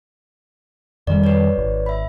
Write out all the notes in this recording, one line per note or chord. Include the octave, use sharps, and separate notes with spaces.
F2 D#3 G3 D5
B4 C#5 D5
G#1
E5 B5